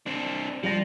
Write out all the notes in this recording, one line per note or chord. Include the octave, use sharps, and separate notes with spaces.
C4 D4
F3 G3 D5 A#6